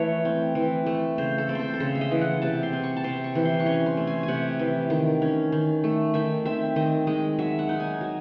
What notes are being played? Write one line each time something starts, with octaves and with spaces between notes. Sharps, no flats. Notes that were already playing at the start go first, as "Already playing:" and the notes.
Already playing: E3 A3 A4 C#5
C4
E3
A3
C#3 C5
A4
C4
A4 C5
A4
C#3 C5
E5
D#5
E3
F#5
C3 A5
C6
C4
C#6
A5
C3 C6
C#6
E3
C6
C#6
C#4 C6
C6
A3
G#5
G#5
C3 F#5
E3
D#3
C#4
D#3
A3
D#3 E5
C4 E5
D#3 D#5
G#3 D#5
F#3 E5
F#5
D#4
G#5
F#3